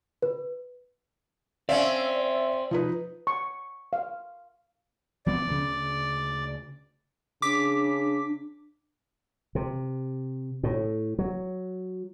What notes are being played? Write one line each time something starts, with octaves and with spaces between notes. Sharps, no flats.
B4
C4 C#4 D5 E5 F5
F3 D#4 B4
C#6
F5
F3 B3 C4 D5
D2 C#3
C#3 D4 D6 B6
C3
A2
F#3